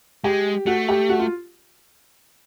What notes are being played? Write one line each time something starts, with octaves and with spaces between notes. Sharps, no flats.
G#3 G4
A3 F#4
G4
F#4
F4